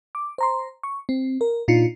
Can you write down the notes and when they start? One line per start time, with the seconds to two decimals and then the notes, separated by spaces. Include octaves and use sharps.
0.15 D6
0.38 C5 A#5 C6
0.83 C#6
1.09 C4
1.41 A#4
1.68 A#2 D4 D#4 F4 C7 C#7